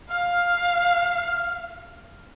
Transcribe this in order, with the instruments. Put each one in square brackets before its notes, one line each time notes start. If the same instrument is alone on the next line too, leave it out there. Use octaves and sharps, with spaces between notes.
[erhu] F5 [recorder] F6